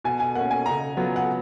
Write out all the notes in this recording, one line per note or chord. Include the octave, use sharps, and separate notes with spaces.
B2 G#5
G#5
A#3 C#4 F#5
G#5
C#3 A#5
F#3 B3 F4
F#5